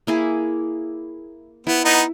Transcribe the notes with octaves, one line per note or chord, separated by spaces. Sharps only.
A#3 E4 G#4
B3 E4
B3 D#4